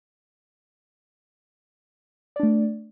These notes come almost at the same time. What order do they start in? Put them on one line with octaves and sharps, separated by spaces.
D5 D4 A3